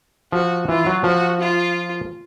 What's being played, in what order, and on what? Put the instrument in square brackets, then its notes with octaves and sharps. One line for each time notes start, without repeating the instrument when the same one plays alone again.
[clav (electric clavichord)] F3 [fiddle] F#4
[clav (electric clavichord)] E3 [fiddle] F4
[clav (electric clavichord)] F#3
[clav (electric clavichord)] F3 [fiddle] F#4
[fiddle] F4